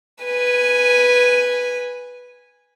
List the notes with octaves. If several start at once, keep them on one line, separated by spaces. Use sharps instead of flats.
B4 G#5